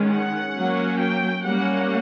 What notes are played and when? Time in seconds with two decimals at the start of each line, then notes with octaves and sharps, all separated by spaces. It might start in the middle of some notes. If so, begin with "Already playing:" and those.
Already playing: D#3 G#3 C#4
0.08 F#5
0.53 F#3 A#3 C#4
0.99 G5
1.44 G3 A#3 C#4 F#5